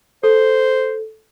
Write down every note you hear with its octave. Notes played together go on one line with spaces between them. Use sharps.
A4 C5